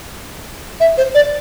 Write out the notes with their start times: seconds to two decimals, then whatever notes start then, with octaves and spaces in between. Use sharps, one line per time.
0.80 E5
0.98 C5
1.15 D5